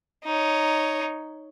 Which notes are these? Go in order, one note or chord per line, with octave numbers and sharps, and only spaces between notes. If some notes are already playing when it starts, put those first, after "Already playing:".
D#4 C#5